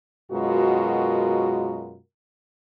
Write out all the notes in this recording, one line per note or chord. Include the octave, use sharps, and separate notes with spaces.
F#2 B2 G#3 F4 F#4 A#4